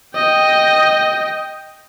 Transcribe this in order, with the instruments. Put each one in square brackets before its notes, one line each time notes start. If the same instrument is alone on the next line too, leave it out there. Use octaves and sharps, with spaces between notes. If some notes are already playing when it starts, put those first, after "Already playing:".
[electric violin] D#5 G5